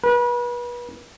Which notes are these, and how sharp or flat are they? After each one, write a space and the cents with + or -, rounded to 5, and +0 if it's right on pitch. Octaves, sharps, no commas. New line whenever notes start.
B4 -35